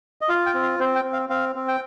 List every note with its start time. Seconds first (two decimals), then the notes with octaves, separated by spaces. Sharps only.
0.21 D#5
0.29 F4 F5
0.46 G5
0.54 C4
0.62 F5
0.79 C4 C5
0.96 G5
1.04 C4
1.13 F5
1.29 C4 F5
1.55 C4
1.68 G5